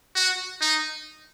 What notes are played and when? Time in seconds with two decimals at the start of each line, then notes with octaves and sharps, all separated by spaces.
0.15 F#4
0.61 D#4